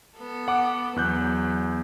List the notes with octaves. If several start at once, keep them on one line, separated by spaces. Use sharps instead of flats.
B3 A4
F#5 D6
E2 F#3 F#6 G6